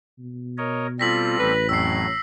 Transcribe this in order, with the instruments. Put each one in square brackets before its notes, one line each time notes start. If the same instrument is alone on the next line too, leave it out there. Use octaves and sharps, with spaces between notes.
[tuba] B2
[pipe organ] A#4 C#5 D#5
[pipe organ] G3 C4 A4 [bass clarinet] F4 [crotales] A#6 B6 F#7
[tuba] A1 [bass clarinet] B4
[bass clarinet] F2 [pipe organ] A2 F#3 [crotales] E6 C7